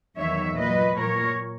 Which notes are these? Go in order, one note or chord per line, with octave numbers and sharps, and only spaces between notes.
E2 D#3 F#3 C#5 E5
A#2 F#3 B4 D#5
A#2 F#3 A#4 C#5